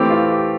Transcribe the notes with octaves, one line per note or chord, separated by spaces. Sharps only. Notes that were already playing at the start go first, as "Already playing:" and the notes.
Already playing: E3 A3 C4 G4
F4
G4